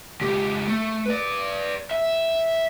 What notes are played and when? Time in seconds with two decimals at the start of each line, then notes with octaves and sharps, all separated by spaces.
0.21 C#2 G4
0.68 A3
1.05 B4 D5
1.91 E5